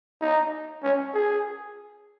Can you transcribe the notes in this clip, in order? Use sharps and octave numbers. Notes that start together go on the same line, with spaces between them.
D#4
C#4
G#4